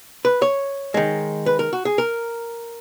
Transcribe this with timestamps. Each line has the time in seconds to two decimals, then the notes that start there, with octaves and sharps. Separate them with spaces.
0.25 B4
0.42 C#5
0.94 D#3 G#3
1.46 B4
1.59 A#4
1.73 F#4
1.85 G#4
1.98 A#4